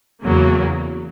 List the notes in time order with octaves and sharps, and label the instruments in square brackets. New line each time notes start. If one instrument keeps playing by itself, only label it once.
[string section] E2 C#3 F#3 A#3